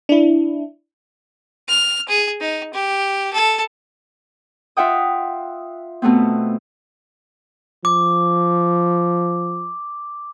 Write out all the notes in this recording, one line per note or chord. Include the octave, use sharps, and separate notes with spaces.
D4 E4
F6
G#4
D#4
G4
A4
F4 E5 F#5 G5 D#6
B2 A3 B3 C4
F3 D6